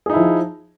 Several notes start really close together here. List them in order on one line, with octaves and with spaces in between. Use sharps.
G#4 D#4 E4 F3